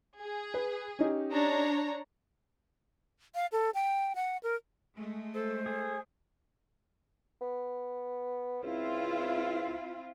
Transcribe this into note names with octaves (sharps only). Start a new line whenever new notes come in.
G#4
B4
C#4 D#4 G4
D4 C#5 A#5
F5
A4
G5
F#5
A#4
G#3 A3
A4 C5
G#4 A4
B3
C#2 C4 E4 F4